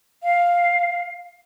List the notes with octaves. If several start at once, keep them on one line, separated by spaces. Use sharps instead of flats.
F5